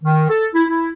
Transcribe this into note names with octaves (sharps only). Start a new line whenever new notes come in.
D#3
A4
E4
E4